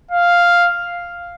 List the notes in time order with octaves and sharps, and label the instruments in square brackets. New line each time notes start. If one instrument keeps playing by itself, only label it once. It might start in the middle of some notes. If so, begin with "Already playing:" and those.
[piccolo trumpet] F5